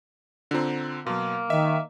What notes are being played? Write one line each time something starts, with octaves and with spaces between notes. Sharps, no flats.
D3 C4 D4 F4 A#5
B2 F#3 A#3 C6
D#3 D#5 E5